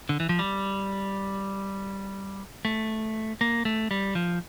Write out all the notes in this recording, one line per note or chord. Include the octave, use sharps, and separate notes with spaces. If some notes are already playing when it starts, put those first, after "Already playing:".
D3
E3
F3
G3
A3
A#3
A3
G3
F3